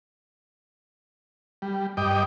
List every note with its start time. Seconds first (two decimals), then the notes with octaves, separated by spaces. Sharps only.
1.62 G3
1.97 G2 D#5 G5 D6